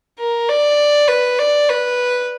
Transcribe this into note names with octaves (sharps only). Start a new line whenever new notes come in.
A#4
D5
B4
D5
B4